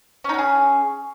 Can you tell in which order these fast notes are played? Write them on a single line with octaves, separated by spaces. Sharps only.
C#4 D#4 F#4 G#4